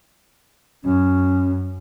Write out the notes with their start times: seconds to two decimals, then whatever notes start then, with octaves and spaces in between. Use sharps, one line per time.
0.83 F#2 C#4